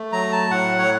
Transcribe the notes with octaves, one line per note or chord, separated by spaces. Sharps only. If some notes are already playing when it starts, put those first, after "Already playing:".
Already playing: A3
F#3 A#5
A5
A2 F#5
C#5